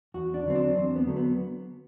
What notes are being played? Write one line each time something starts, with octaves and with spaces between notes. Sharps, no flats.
E2 F#4
D4
D3 F#3 C4
D4
E2 C4
B3
D3 F#3 A3
B3